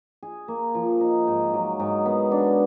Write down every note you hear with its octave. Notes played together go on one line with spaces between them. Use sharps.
G#4
A#3
F3
D#4
G#2
F#3
G#2
B3
D4